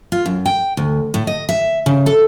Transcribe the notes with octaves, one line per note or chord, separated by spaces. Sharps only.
F4
F#2
G5
D2
A2
D#5
E5
C#3
A4